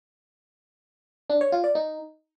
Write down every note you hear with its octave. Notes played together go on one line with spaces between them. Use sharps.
D4
C#5
F4
D5
D#4